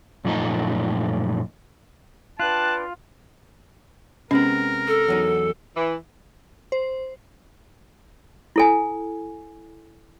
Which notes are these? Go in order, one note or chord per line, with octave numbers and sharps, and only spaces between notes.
F#2 A#2 F3 A3 D#4 D#5
D4 F4 B4 G5 A5 F#6
C3 G#3 B3 C#4 A#4
A4
E2 F#3 D#4
E3
C5
E4 A4 G#5